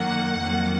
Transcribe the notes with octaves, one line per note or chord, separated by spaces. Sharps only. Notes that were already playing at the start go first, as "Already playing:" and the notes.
Already playing: F#2 D#3 A#3 F#5
F2 D#3 F#3 A#3